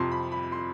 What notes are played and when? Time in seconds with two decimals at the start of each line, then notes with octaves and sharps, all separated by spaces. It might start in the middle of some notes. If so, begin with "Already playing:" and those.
Already playing: F2 C3 F3 C6
0.11 B5
0.32 B5
0.52 C6